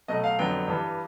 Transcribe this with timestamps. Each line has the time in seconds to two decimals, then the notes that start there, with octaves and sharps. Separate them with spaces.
0.08 B2 F#3 A3 D#5
0.24 F5
0.39 F2 D3 F#3 B3 G5
0.68 G2 E3 G3